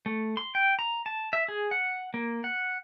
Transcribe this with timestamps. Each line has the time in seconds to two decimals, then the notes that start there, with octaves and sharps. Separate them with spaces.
0.06 A3
0.37 C6
0.55 G5
0.79 A#5
1.06 A5
1.33 E5
1.48 G#4
1.71 F#5
2.14 A#3
2.44 F#5